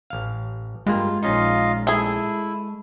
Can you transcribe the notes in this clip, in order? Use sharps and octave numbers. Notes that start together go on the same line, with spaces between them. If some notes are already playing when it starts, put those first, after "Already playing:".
A1 F5
G2 G#3 A#3 F4
A#1 C#4 D#4 F4 D#5 F5
A3 E4 G#4